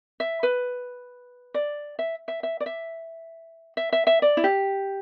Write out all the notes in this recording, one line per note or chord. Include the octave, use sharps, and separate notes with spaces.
E5
B4
D5
E5
E5
E5
D5
E5
E5
E5
E5
D5
E4
G4